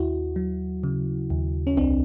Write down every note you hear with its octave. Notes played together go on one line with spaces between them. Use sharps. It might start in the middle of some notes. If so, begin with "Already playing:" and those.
Already playing: D#2 E4 F#4
F#3
C#3
D#2
C#4
C2 C4 D4